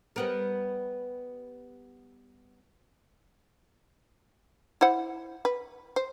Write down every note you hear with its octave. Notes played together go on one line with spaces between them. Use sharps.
G3 B3 A#4
E4 C5 F#5
B4
C5